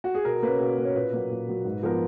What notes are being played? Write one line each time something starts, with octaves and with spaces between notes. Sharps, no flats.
F#4
G#4
B2 A#4
A#3 C#4 B4
B2
A#3 C#4
C#5
A#2 B4
F#3 A#3
A#2
F#3 A#3
G#2
F3 B3 A#4